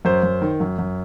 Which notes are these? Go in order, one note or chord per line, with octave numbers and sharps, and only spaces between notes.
F#2 C5
F#2
D#3
F#2
F#2